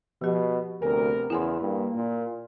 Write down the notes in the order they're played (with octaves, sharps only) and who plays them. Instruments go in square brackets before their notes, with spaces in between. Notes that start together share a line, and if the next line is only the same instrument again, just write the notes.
[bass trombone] B2 [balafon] F3 G4
[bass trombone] D2 [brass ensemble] C3 B3 A#4 [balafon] G#5
[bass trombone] E2 [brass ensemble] C#3 [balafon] E4 G#5 C6
[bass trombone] G2 [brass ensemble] A#3
[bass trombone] A#2